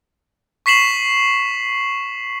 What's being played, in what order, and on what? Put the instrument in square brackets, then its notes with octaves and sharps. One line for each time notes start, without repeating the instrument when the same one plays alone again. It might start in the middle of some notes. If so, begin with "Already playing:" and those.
[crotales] C#6 B6 C7 E7 F#7